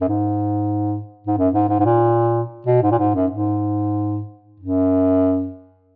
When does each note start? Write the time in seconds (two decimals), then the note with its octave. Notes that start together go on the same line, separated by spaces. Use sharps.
0.01 F#2
0.09 G#2
1.27 G#2
1.38 F#2
1.54 G#2
1.69 G#2
1.80 G#2
1.85 A#2
2.67 B2
2.83 G#2
2.92 A#2
2.98 G#2
3.15 F#2
3.31 G#2
4.60 F#2